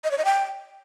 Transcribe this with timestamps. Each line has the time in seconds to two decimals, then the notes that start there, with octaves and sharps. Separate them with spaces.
0.04 D#5
0.11 C#5
0.18 D#5
0.25 G5